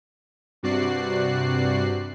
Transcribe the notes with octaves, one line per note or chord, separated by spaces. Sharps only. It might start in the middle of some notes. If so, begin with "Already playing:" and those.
G2 C3 F#4 D5 F#6 C7